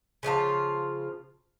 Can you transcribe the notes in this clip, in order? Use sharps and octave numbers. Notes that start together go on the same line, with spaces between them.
C#3 F3 F4 A5